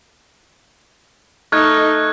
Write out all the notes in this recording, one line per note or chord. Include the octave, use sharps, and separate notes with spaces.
A3 D#4 F6 F#6 G#6